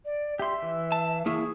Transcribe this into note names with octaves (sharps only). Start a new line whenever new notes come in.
D5
G4 E5 C6
E3
A5
A#3 E4 G#4 C#6